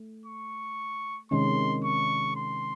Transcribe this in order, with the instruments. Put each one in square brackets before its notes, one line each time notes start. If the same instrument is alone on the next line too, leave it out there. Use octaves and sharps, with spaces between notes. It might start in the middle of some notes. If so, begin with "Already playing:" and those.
Already playing: [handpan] A3
[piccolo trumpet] C#6
[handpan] C3 D#3 G#3 C#4 [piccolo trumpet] C6
[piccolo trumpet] C#6
C6